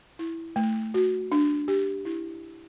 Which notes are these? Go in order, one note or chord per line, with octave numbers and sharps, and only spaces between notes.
E4
A3
F#4
D4
G4
E4